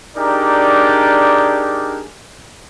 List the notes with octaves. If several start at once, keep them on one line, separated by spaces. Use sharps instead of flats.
D4 D#4 G4 G#4 A#4 D5